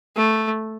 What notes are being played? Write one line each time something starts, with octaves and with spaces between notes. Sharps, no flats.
A3